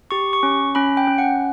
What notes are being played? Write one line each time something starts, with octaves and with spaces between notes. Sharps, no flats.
G4 C#6
C#6
C#4
C#4 B5
G5
C#4
F#5